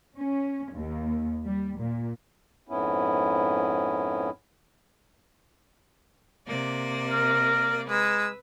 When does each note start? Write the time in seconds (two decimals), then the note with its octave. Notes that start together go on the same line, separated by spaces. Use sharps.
0.16 C#4
0.72 D#2
1.45 G3
1.79 A#2
2.69 F2 G#2 B3 C#4 E4
6.46 C3 A#3 D5
7.11 A#4
7.89 G#3 B4 E6